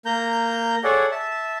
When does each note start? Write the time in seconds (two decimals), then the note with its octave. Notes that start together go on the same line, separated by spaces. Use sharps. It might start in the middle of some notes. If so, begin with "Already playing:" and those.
0.06 A#3 A#5 G6
0.84 G#4 A4 C#5 D5 F#5
1.12 E5 A5